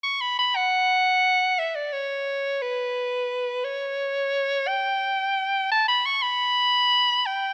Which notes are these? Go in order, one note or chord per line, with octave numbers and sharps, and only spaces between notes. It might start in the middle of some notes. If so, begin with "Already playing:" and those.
C#6
B5
B5
F#5
E5
D5
C#5
B4
C#5
G5
A5
B5
C#6
B5
G5